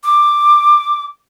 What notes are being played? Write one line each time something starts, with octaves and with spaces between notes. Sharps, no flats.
D6